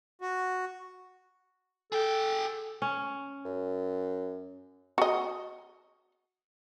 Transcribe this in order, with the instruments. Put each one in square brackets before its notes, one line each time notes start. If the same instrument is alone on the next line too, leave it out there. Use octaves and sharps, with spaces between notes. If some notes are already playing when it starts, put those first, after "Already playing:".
[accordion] F#4
[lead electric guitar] G#4 G5 [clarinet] A4
[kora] C#4
[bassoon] F#2
[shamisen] F#4 D#5